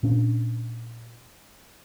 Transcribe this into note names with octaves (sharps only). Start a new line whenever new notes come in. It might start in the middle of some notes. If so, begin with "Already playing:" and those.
A#2 C#4 D4